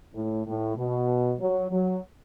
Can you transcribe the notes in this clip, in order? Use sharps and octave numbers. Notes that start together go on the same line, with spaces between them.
A2
A2
B2
F#3
F#3